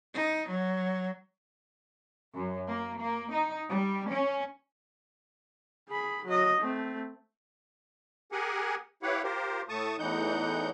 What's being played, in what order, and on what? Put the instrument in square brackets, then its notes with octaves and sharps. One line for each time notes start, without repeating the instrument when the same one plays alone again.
[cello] D#4
F#3
[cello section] F#2
A#3
A#3
D#4
G3
C#4
[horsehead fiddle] G#4 B5
F#3 D#5
A3 C4
[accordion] G4 G#4 A#4 F#5 G#5
E4 G4 B4 C#5 F5 F#5
F4 G4 A#4 C5
A2 A3 A5 C#6 D#6
E2 A2 E3 D#4 F#5 G6